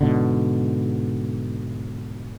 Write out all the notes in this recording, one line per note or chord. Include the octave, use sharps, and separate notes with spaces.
G#2 B2 D3